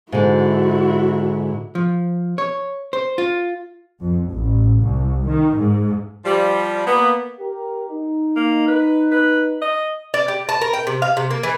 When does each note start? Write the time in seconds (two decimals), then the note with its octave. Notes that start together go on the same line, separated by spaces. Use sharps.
0.12 G#2 D3 E4 F#4
1.75 F3
2.38 C#5
2.93 C5
3.18 F4
4.00 F2
4.31 A1
4.79 C2
5.27 D#3
5.56 G#2
6.25 F3 G3
6.86 A#3 B3
7.39 G4 A#4
7.90 D#4
8.36 A#3
8.68 B4
9.11 B4
9.62 D#5
10.14 D5
10.28 G4
10.49 A5
10.61 A#4
10.73 G5
10.87 C3
11.02 F5
11.17 C3
11.31 A#3
11.43 E3